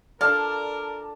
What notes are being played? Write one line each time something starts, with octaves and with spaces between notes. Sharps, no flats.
D4 F4 A4 A#4 D5 F5 A5